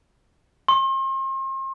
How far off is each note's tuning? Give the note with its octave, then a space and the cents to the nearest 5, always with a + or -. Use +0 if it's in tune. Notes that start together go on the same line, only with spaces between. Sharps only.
C6 +40